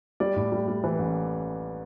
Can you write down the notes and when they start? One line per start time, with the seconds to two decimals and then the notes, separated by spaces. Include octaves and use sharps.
0.20 G3 D5
0.36 A2
0.52 G3
0.68 G3
0.84 E3
0.99 A1